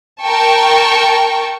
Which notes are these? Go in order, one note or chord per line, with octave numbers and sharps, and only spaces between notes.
A#4 G5 A5 C#6